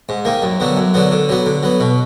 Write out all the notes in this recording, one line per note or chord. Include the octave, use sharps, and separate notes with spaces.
G#2
D#3 A#3
F#2
D3 F#3 B3
F#2
D3 F#3 B3
D3
F#3 B3
D3
F#3 B3
B2